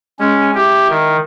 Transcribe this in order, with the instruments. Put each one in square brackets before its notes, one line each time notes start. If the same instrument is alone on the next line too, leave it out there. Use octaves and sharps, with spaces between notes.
[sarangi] G#3 [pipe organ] C#4
[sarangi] E4 [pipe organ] G4
[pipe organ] D#3